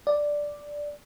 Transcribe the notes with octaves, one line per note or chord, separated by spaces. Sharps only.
D5